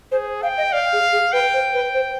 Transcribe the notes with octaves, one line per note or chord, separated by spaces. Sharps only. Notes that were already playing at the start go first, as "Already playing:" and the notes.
G#4 C5
F5 G5
D#5
D5 F5
G#4
G#4
B4 G5
C5
B4
C5